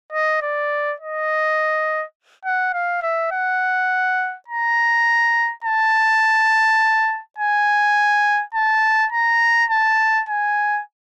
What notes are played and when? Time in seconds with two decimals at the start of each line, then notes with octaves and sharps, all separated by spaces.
0.13 D#5
0.42 D5
1.00 D#5
2.45 F#5
2.73 F5
3.03 E5
3.32 F#5
4.48 A#5
5.65 A5
7.39 G#5
8.55 A5
9.13 A#5
9.70 A5
10.29 G#5